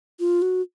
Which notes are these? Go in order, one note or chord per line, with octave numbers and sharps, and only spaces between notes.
F4
F#4